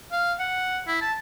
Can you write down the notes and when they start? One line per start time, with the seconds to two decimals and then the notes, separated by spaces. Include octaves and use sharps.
0.12 F5
0.39 F#5
0.88 E4
1.02 A5